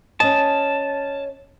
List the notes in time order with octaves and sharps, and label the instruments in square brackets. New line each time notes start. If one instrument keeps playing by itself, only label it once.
[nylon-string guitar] C#4 D#5 [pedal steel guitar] A5